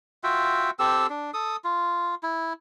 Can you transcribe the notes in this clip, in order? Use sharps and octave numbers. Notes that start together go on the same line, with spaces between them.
F4 F#4 E5 G5
C4 G4 A4 E6
D4
A4 D#6
F4
E4